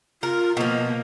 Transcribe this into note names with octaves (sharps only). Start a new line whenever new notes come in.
F4 A#4
B2 F3 A#3 D#5